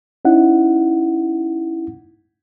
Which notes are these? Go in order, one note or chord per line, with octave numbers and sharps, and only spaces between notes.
C#4 D#4 E4 F#5